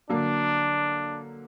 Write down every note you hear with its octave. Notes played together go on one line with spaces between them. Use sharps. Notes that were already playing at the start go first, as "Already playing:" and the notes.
D3 F#3 A#3 D4